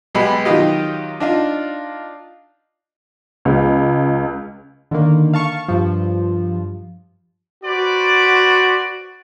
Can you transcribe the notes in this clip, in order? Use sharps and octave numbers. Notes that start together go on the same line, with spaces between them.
B1 G#3 B3 G4 B5
D#3 F#3 D#4 F4 G4 D#5
D4 D#4 F4
C#2
D3 D#3 A#3
F5 A5 C#6
G2 F3
F#4 B4 C5 D5